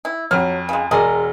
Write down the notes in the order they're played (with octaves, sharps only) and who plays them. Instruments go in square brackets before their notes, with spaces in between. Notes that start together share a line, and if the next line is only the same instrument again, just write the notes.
[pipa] E4
[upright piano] F2 F6 [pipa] F#3 C#5
[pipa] C#3 G#3
[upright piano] E1 D5 [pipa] G#3 G#4 A#4